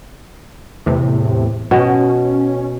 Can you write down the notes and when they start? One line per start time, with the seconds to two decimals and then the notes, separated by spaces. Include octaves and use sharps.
0.86 E2 A2 C3
1.71 B2 C#4